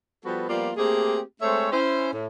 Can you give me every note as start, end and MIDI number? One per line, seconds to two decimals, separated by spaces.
0.25 0.48 53
0.25 0.48 55
0.25 0.48 59
0.25 0.48 66
0.25 0.48 69
0.25 0.48 71
0.49 0.71 53
0.49 0.71 55
0.49 0.71 58
0.49 0.71 59
0.49 0.71 65
0.49 0.71 74
0.77 1.20 57
0.77 1.20 58
0.77 1.20 60
0.77 1.20 67
0.77 1.20 68
1.42 1.69 56
1.42 1.69 57
1.42 1.69 60
1.42 1.69 72
1.42 1.69 73
1.42 1.69 76
1.72 2.11 61
1.72 2.11 64
1.72 2.11 72
2.13 2.26 45